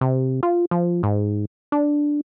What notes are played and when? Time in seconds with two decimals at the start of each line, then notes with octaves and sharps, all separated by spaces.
0.01 C3
0.43 F4
0.71 F3
1.03 G#2
1.72 D4